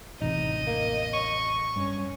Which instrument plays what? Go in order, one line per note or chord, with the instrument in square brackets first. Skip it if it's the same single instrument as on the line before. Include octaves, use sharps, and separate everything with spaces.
[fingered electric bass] A1 E2 C3 [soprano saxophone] D#4 [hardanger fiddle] D#5
[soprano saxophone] A#3
C#6
[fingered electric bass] G2 [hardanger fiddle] C#4